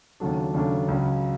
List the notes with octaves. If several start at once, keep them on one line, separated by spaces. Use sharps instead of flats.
D#2 C#3 F#3 A3 D4
D#2 C#3 F#3 A3 D4
C#2 C#3 F#3